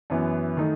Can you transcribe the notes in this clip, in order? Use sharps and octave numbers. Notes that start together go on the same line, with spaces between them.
F#2 E3 B3
D#3 A3 D#4